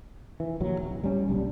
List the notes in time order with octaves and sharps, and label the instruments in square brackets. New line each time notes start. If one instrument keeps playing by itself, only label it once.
[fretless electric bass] E3
A#1 D#2 F#3
D1
G3 C#4
F#1 B1 G3 D4